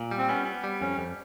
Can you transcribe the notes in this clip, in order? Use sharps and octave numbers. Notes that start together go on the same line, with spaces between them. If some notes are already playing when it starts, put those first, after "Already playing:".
Already playing: A#2
G3
C4
B3 C#4
B3
G3
F2 C#4
F2